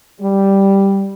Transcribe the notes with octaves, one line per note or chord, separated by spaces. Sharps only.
G3